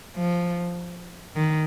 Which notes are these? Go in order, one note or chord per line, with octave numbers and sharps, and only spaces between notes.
F3
D#3